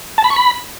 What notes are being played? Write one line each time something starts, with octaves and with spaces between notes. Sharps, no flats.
A5
B5
C#6
B5